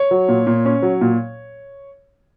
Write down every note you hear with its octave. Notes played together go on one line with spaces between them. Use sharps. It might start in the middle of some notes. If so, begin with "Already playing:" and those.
Already playing: C#5
F#3
A#2
A#2
C#4
F#3
A#2